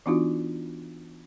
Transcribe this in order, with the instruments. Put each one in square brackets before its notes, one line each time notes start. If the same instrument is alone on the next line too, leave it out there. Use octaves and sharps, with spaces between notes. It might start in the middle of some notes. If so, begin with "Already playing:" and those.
[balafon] E3 B3 D4 D#4 F4 F#4